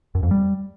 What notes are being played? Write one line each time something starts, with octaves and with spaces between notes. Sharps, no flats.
F#2
F2
G3